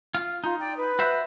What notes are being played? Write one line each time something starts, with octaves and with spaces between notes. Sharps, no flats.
F4
D#4 F4
D5 G5
B4
F#4 C5 E5